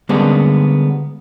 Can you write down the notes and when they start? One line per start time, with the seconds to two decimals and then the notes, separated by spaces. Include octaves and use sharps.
0.09 D3 G3 G#3 A#3 B3 C#4